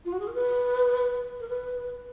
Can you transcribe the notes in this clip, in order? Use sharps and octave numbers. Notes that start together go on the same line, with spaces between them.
F4
F#4
G#4
A#4
B4
A#4
B4